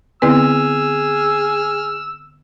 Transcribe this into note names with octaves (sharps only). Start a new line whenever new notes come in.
D3 B3 C4 E4 G#4 B4 E6 F6